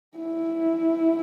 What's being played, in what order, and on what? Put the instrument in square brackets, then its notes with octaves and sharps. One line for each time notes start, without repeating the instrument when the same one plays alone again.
[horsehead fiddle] E4